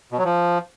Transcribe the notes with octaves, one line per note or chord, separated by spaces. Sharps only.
B2
F#3
F3